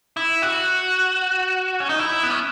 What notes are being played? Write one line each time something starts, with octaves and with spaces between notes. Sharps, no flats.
E4
F#4
C#4
D#4
E4
B3
C#4